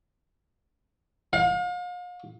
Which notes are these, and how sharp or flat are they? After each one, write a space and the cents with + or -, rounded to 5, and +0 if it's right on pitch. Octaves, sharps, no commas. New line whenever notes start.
F5 +40